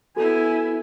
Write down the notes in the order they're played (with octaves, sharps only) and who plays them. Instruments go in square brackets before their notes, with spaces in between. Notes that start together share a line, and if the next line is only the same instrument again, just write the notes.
[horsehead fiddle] B3 E4 [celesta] F#4 A4 [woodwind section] G#5